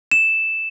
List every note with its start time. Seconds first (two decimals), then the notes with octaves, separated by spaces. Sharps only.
0.12 E7